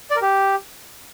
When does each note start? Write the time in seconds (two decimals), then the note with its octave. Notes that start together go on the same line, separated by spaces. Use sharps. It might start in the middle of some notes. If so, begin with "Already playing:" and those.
0.11 D5
0.16 A#4
0.22 G4